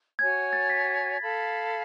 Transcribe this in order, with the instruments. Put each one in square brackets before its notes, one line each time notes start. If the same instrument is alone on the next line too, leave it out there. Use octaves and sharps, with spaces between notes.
[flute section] F#4 C#5 G#5 [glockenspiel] G#6
[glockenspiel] A6
B6
[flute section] A4 F5 B5